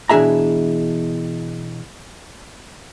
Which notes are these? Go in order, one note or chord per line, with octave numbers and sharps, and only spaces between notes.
B2 E3 D4 G#4 E5 A#5